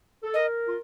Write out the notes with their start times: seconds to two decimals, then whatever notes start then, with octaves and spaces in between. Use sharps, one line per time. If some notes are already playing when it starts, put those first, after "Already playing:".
0.23 A4
0.34 A#4 D#5
0.68 F4